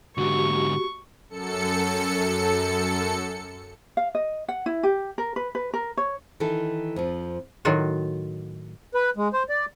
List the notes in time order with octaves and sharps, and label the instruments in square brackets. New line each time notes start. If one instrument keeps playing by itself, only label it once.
[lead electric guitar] G#2 D3 [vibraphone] F#4 G4 [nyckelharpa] C#6
[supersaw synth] F#2 A4 C#7
[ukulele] F5
D#5
F#5
E4
G4
A#4
B4
B4
A#4
C#5
[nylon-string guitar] D#3 E3 D#4 A4
F2 F3
[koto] A2 D#3 F#3 F4 F#4
[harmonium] B4
G#3
C5
D5